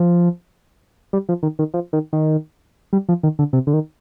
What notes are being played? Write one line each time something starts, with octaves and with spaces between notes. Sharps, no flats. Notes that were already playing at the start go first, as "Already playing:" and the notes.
Already playing: F3
G3
F3
D#3
D#3
F3
D#3
D#3
G3
F3
D#3
D3
C3
D3
D#3